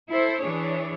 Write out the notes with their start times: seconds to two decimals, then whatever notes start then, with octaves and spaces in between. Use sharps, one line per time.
0.10 E4 A4 C5
0.43 E3 D4 G#4 C#5